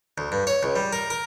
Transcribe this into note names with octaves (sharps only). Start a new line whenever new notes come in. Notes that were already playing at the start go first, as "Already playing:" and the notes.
D2
G2
C#5
C#2
G3
A#4
A#4